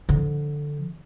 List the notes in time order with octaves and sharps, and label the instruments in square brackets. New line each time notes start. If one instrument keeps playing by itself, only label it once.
[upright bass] D3 F3